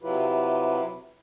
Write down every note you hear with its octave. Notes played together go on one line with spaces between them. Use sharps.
C3 F#3 E4 F4 G4 B4